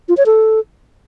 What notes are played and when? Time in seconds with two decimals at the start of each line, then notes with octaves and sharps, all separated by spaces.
0.09 F4
0.17 C#5
0.26 A4